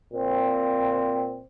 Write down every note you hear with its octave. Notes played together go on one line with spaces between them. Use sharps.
A#2 C4